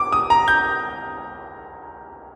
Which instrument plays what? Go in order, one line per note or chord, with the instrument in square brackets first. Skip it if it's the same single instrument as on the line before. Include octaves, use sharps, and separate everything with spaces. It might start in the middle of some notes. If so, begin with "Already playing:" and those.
Already playing: [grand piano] D6
D#6
A#5
G6